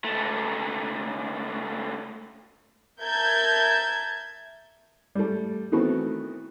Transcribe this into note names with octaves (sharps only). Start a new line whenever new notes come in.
C#2 A3
A#4 E5 A5 G6 G#6
G3 A3
D#3 E3 A3 B3 C4 F#4